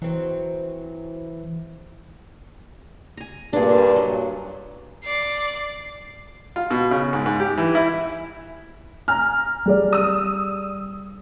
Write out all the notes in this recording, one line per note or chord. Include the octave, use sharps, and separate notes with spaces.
E3 F#3 C4
G#5 A#5
G2 A#2 D4 G#4
F#3
D5 C7
F4
B2
C#3
G#2
G#2
G4
E3
E4
G#5 A#5 F6
G3 G#4 D5
D#6 E6